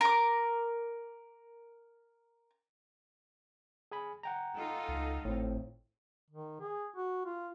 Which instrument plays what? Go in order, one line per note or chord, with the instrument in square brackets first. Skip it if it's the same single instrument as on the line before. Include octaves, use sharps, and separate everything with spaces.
[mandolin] A#4 D6
[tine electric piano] G#4 G#5 B5
F#5 G5 A#5
[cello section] D#4 F4 A4
[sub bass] C#2
[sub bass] G#1 [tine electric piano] A2 C4
[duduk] D#3
G#4
F#4
F4